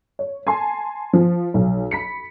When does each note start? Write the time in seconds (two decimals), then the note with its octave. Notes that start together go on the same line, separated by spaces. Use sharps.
0.19 C#5
0.47 G#5 A5 C6
1.13 F3
1.54 B1
1.91 B5 B6 C#7